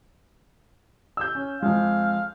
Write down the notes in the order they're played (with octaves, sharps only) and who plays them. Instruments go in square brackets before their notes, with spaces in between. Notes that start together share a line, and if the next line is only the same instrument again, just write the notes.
[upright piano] E6 G6
C#4
[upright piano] F2 G#3 [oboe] F5